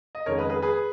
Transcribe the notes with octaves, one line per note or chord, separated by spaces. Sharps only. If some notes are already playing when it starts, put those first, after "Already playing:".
D#5
F2 D#3 G#3 C#4 A#4 C#5
B4 D#5
G#4 B4
G#4 B4